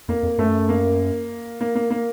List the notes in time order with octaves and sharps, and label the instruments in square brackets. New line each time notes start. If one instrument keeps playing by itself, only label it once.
[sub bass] F2 [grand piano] A#3
[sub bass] F2
[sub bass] F#2 [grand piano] A3
[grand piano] A#3
A#3
A#3
A#3